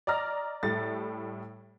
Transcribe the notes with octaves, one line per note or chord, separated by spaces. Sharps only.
D5 D#5 A#5 F6 A#6
A2 G3 A4 A6